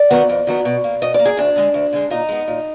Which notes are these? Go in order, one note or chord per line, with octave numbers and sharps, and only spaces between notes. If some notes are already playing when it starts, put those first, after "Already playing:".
Already playing: D5
D#3 F#3 B3
F2
D#3 F#3 B3
B2
A#3
B2 D#5
A#3 D5
G#4
D2 D4
D3 G#3
D2
D3 G#3
A#2 D#4
G#3 B3
A#2